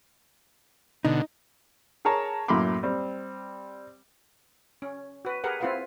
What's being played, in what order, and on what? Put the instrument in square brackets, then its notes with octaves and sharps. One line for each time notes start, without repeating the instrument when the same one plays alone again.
[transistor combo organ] B2 D3 [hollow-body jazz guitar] D#4
[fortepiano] G#4 A#4 C#5 A5 A#5
F#2 A2 A#3 B5 C6 D6
G3 C4
[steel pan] C#4
F#4 B4
G4 G#4 A#4 B4 F#5
C4 E4 F4 B4 F5 F#5